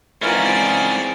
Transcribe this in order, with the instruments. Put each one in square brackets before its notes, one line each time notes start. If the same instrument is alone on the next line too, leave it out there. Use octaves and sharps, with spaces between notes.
[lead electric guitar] G#2 C#4 [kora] E3 F4 A#4 [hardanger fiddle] C4 D5